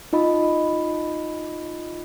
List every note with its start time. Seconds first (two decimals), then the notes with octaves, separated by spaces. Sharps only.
0.13 D#4 F4 D#5 B5